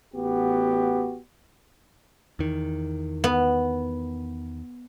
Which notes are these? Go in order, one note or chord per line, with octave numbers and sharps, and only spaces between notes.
A1 B3 F#4 G4
E2 D#3
B3